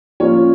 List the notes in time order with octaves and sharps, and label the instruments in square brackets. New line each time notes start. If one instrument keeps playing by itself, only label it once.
[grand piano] F3 A#3 C#4 C#5